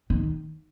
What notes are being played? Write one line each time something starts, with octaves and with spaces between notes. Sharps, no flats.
D#3